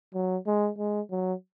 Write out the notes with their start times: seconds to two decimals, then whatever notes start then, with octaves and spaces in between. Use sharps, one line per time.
0.14 F#3
0.47 G#3
0.78 G#3
1.11 F#3